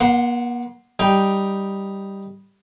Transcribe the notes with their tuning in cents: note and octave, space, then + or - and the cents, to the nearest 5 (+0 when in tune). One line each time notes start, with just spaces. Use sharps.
A#3 +45 F#5 +0 C6 +0
G3 +0 D#4 +0 G5 +0